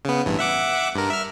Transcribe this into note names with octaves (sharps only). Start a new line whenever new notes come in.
C#3 B3
A1 G2 E3
E5 F#5 D6
G2 A#4
E5 F6